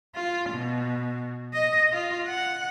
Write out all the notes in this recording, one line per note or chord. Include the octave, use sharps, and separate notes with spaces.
F4
B2
D#5
F4
F#5